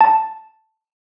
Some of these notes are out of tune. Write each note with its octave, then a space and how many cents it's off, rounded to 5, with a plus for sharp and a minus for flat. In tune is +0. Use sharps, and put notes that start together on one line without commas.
A5 +0